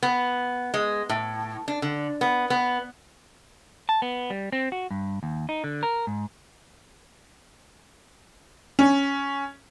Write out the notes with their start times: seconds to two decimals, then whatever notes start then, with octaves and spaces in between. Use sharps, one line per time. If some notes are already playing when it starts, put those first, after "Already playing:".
0.03 B3
0.74 G#3
1.09 A2
1.68 D4
1.82 D3
2.21 B3
2.50 B3
3.89 A5
4.02 B3
4.30 G3
4.52 C4
4.72 F#4
4.91 G2
5.23 D#2
5.49 D#4
5.64 D3
5.83 A#4
6.07 G#2
8.79 C#4